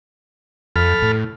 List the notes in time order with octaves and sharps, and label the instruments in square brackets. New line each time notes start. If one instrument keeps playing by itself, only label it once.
[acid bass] F2 [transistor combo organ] A4 B5 F6
[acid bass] A2